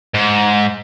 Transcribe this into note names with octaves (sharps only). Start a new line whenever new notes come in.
G#2